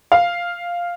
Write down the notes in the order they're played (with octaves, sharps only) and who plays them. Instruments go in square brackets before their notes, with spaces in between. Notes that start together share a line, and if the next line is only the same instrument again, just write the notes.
[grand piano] F5